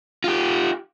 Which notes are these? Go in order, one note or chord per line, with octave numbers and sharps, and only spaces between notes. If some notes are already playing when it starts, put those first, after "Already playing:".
F4 G4